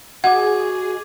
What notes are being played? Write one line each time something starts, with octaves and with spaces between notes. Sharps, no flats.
F#4 G#4 D#5 F#5 D6 G#6